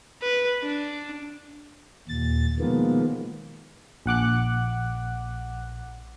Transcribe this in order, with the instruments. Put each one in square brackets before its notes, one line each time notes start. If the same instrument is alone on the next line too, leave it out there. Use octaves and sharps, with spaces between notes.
[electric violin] B4
D4
[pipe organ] D#2 A#2 A6
B2 D#3 F3 G#3 A#3 B3
[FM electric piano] A#1 F#5 D6 F#6